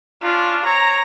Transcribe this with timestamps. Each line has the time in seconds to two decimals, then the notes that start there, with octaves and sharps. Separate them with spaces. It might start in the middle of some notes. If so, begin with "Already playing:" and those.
0.22 C#4 D4 F4
0.65 C4 C#5 A#5